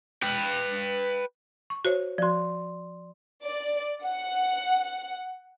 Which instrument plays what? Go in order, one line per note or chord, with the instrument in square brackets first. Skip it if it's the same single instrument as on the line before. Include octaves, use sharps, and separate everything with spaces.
[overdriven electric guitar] B4 G5
[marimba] C#6
F#4 C5 C#5
[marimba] F3 F#4 [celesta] D5 C6
[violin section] D5
F#5